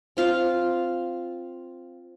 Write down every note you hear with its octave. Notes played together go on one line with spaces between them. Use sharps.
C4 F4 F5